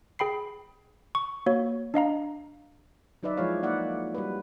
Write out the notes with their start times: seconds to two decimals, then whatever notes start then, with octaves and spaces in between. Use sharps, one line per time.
0.19 G#4 G5 B5 C7
1.15 C#6
1.46 A#3 F#4 C#5
1.94 D4 D#5 F5 A#5
3.23 F#3 D#4 B4 D5 E5
3.37 F3 G#3 E4 G#4 C#5 F5
3.63 A#3 D#4 D5 E5 F#5
4.15 G3 F#4 B4